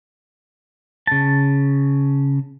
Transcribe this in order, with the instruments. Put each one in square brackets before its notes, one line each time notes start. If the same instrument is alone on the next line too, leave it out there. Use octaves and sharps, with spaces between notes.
[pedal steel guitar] C#3 A5